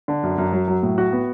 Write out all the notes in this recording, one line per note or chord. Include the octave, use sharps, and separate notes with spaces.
D3
F#2
F#2
F#3
F#3
A2
F#4
B3